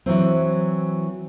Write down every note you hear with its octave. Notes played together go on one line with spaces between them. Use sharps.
E3 F#3 C4